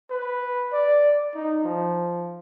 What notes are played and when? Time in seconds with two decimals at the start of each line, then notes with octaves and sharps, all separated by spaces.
0.10 B4
0.72 D5
1.34 D#4
1.64 F3